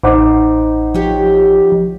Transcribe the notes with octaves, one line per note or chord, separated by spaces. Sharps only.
A1 D#4 C5 F#5 D6
F3 G4 C#5